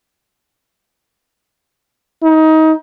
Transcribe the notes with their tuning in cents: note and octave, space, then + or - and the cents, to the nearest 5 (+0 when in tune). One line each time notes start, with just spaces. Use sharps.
D#4 +25